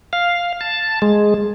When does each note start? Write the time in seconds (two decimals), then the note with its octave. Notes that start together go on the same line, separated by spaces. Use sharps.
0.13 F5
0.61 A5
1.02 G#3